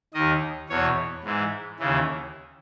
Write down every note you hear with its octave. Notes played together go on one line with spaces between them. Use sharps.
D#2 D#3 D#5
E2 B2 C#5
G#2 E3
D#2 C#3 E3